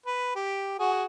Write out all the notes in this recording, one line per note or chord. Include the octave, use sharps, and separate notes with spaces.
B4
G4
F#4 G#4